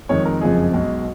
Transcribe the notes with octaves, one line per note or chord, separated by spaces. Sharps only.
F2 D#3 G#3 C#5
A#4
F#1 F2 F3 G#3 G#4
B1 B2 G#3